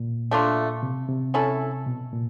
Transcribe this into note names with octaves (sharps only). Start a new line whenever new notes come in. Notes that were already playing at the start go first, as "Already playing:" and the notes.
Already playing: A#2
A3 D4 F4
C3
C3
C#4 E4 A4
B2
A#2